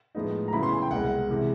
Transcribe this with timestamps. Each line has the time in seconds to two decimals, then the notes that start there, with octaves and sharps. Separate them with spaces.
0.15 A2 F3 G#3 B3 D#4
0.48 A#5
0.53 C#3 F#3 B3 E4 B5
0.63 C6
0.72 G#5
0.82 G5
0.91 C2 B2 G#3 F#5
1.29 C3 E3 G#3